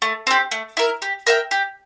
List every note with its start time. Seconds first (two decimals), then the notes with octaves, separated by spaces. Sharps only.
0.02 A3
0.27 C4 G4
0.51 A3
0.77 E4 A#4
1.02 G4
1.27 A#4 E5 G5
1.51 G4